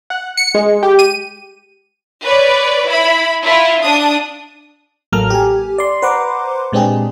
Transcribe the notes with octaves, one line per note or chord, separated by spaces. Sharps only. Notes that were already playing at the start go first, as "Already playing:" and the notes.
F#5
C#7
G#3
G4
D#7
B4 C#5 D5
E4 B5
E4 F4
D4 D#6
A1 F#3 A#3 A4 A#5 F6
G4 G#5
D5 C6
B4 C5 F#5 A#5 C6 D6
A#2 G#3 C4 D4 G4 G#4